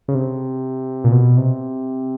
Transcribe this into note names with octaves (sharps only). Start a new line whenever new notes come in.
C#3
C3
A#2
B2
C3